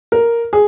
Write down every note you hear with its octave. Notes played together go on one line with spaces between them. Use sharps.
A#4
G#4